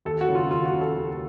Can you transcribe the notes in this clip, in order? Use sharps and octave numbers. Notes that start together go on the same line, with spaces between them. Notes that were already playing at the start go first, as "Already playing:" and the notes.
D#2 A4
F#4
C#3
F4
D#2 F4
F#4
C#3
A4
D#2